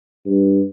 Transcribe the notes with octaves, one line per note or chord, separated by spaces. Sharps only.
G2